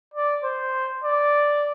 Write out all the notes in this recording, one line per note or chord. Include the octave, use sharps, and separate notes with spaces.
D5
C5
D5